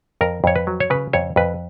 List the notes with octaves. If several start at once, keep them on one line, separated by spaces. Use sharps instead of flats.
F2 A#4
F2 C#5
B4
F#3
C#5
C#3 B4
F2 C#5
F2 B4